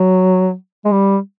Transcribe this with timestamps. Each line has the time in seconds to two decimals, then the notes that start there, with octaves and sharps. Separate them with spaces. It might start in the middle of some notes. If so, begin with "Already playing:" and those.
Already playing: F#3
0.85 G#3
0.91 G3